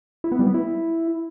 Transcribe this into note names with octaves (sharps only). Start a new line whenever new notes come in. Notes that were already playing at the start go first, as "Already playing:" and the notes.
E4
B3
G3
B3
E4